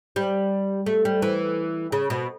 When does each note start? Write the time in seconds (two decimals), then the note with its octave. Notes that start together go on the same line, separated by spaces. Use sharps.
0.16 G3
0.86 A3
1.05 G3
1.22 E3
1.92 C#3
2.10 B2